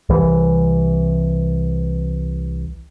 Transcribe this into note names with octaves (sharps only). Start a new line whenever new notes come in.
C2 E3